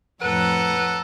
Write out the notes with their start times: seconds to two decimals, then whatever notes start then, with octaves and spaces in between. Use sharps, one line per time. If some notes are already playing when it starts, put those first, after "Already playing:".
0.22 F2 A2 A4 B4 F#5 A#5